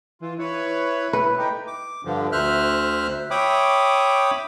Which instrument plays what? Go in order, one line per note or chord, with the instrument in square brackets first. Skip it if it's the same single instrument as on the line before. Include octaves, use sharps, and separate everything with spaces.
[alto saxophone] E3 [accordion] F4
[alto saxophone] E4 [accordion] B4 C#5
[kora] B4
[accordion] A3 D#4 G4
[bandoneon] D6
G2 D3 F3
D2 C5 E5 F6 F#6
C#5 E5 G5 B5 D6 D#6